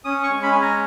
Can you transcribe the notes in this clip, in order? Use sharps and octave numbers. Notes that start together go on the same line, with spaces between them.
C#4 D#6
C#6
G#3
B5
C#4 G#5
A#5